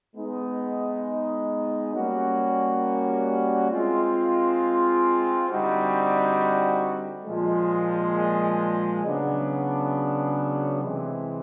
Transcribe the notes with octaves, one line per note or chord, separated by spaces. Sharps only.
G#3 B3 D#4
G3 A#3 C#4 F#4
G#3 C4 F4
D3 G3 C4 D#4 F#4
A#2 F3 G#3
C#3 F#3 B3 D4
C3 E3 G#3 C4